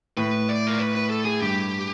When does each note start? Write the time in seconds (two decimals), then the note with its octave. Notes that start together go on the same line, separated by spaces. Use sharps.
0.17 A2 B4
0.49 D5
0.67 A#4
0.79 B4
0.95 B4
1.10 A4
1.25 G#4
1.40 G2 G4